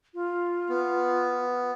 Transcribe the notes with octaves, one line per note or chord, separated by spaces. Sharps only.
F4
B3